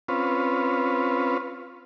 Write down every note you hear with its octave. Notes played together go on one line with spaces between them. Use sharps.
C4 C#4 F4 B4